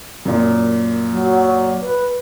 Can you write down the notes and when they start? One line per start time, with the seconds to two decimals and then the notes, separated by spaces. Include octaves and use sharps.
0.25 F#2 A#2
1.10 F#3
1.82 B4